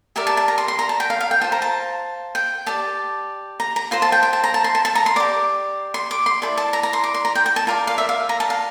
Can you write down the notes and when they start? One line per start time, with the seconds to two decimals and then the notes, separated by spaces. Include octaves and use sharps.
0.16 G4 A#4 D5 E5
0.27 A5
0.37 A5
0.48 A#5
0.58 C6
0.68 C6
0.79 A#5
0.89 A5
1.00 G5
1.10 F5
1.21 F5
1.31 G5
1.41 F4 A5
1.44 C5
1.52 A#5
1.62 A5
2.35 G5
2.66 G4 D5 A5
3.60 A#5
3.76 A#5
3.91 F4 C5 C6
4.02 A5
4.12 G5
4.23 G5
4.33 A5
4.44 A#5
4.54 A5
4.64 C6
4.75 A5
4.85 A5
4.95 A#5
5.06 C6
5.16 G4 D5 D6
5.94 C6
6.11 D6
6.26 C6
6.42 E4 A4 D5
6.57 A5
6.73 A#5
6.83 A#5
6.93 C6
7.04 D6
7.14 C6
7.25 A#5
7.35 G5
7.46 G5
7.56 A5
7.67 F4 A#4 D5 A#5
7.87 F5
7.98 E5
8.09 F5
8.29 A#5
8.40 A5
8.50 F5